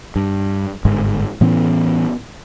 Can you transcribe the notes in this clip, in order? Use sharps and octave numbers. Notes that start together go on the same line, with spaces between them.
G2
G1 G#2 G#3
A2 E3 B3 C#4